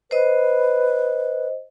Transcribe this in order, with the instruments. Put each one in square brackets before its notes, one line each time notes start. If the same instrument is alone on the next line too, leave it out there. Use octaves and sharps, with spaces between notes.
[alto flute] B4 [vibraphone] C5 D#5